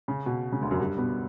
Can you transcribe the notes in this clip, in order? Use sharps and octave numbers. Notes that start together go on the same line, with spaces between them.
C#3
B2
C#3
D2 D3
F#2 F#3
G2 G3
B2 B3